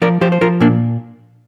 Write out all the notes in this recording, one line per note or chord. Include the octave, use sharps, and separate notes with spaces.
F3 A#4 D5
F3 G4 C5
C5
F3 F4 A#4
A#2 A#3 D4